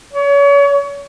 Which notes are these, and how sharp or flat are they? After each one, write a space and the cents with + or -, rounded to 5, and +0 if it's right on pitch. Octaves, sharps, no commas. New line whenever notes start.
C#5 +35